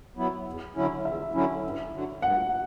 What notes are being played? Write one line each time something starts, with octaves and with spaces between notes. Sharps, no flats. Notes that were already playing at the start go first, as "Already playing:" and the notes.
F#3 B3 E4
E2
D3 F#3 C#4 E4
E2 E5
D3 F#3 C#4 E4
G2
D3 F#3
G2 F#5